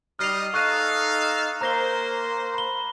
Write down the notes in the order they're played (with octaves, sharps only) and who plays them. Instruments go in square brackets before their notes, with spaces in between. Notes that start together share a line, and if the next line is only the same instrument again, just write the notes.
[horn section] G3 D#4 D#5 [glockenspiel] F6 C7 F7
[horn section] D#4 A4 F5 [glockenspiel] C#6 F#6 D#7
[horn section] A#3 C5 [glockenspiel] A#5 A#6 G7
[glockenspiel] B5 G7